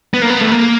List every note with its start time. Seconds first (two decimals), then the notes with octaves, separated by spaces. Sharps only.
0.14 B3
0.22 A#3
0.30 B3
0.41 A3
0.52 A#3